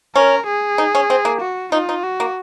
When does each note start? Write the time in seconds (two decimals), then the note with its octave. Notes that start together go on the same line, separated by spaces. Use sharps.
0.16 C#4 A#4
0.47 G#4
0.78 D#4
0.95 C#4
1.10 C4
1.25 A#3
1.41 F#4
1.72 D#4 F4
1.89 D#4
2.03 F#4
2.20 A#3